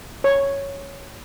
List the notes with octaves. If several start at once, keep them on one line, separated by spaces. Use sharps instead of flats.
C#5